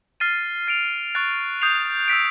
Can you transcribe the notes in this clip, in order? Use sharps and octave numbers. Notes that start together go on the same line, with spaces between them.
F6 A6 C7 D#7
A6 D7 F7
C#6 F#6 A6
D#6 G6 C7 F7
E6 G6 B6 D7